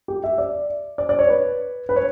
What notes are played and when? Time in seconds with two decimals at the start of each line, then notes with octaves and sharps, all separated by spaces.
0.08 G4
0.24 E5
0.38 D5
0.98 D5
1.09 D5
1.19 C#5
1.29 B4
1.89 B4
1.96 C#5